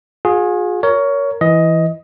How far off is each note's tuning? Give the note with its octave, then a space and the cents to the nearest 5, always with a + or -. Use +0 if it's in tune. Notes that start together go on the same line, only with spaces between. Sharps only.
F4 +45 G#4 +0
A#4 +0 C#5 +20
E3 +0 D#5 +15